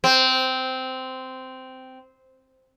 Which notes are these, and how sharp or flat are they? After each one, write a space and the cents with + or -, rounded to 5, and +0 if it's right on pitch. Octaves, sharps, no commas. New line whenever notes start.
C4 -10